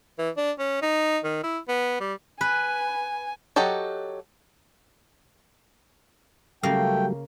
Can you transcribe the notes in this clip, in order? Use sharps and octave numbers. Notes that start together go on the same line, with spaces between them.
E3
D4
C#4
D#4
D#3
E4
B3
G3
B4 G#5
F#3 G4 A4 D#5
C#3 F#3 G3 A3 A#3 F5 G5